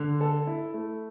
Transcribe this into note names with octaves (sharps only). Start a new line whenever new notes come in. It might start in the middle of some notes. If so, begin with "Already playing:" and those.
Already playing: D3
A4
E4
A3